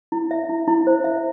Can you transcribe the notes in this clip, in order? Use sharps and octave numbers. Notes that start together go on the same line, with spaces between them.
E4
E5
E4
E4
C5
E5